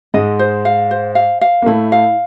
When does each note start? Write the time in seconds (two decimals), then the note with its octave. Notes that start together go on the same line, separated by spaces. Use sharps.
0.14 G#2 G#3 D#5
0.39 C5
0.65 F5
0.91 C5
1.15 F5
1.41 F5
1.62 A#3
1.66 A2 A3 E4
1.92 F5